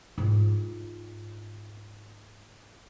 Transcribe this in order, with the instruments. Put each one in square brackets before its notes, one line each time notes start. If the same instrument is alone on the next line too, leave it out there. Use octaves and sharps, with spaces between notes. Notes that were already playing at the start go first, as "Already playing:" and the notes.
[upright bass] G#2 F4